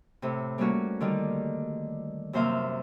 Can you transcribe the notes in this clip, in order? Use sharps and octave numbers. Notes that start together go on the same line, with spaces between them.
A2 C3
G3 A3 A#3 C#4 F#4
D3 D#3 G3
F#2 C3 A#3 C5 E5 F5